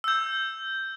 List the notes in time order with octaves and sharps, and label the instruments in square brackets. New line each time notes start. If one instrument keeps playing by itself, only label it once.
[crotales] E6 G6